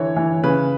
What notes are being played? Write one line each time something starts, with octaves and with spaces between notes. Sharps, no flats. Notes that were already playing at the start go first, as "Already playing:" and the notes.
Already playing: D3 E3 C#5
E3
C#3 B4